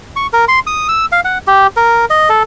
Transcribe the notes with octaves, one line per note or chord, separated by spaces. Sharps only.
C#6
A#4
C6
D#6
E6
F5
F#5
G4
A#4
D#5
A4